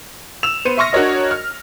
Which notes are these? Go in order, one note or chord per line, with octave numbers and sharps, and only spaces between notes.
E6 E7 F7
B3 C5 C#7 D#7
E5 C6 C#6 F6 A#6
D4 F#4 A#4 C#5 D#5
F6